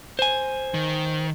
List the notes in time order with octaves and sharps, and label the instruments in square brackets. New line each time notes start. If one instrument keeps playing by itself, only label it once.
[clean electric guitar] C5 G#5
[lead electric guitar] D#3